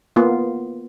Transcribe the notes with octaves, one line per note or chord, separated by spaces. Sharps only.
A#3 B3 F4